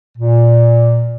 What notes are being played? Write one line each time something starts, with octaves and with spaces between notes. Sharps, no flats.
A#2